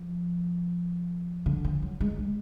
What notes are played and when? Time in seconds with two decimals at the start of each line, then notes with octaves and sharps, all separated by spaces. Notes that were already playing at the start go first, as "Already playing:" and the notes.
Already playing: F3
1.46 D3
1.65 F3
1.82 F#3
2.00 G#3
2.19 G#3